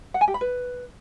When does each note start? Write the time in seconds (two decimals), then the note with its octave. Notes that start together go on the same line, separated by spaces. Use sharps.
0.14 F#5
0.21 G#5
0.28 G4
0.34 B5
0.41 B4